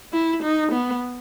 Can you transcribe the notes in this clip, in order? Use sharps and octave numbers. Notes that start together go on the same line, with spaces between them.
E4
D#4
B3